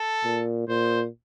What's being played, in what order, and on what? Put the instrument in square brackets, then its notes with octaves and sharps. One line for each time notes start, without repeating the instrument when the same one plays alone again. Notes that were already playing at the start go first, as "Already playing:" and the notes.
Already playing: [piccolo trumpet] A4
[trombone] A#2
[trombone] A#2 [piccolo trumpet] C5